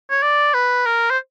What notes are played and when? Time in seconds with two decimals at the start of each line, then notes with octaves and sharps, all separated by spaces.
0.11 C#5
0.23 D5
0.54 B4
0.86 A#4
1.10 C5